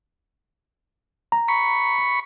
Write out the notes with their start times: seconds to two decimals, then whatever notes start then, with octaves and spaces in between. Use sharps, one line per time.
1.32 A#5
1.48 B5 C#6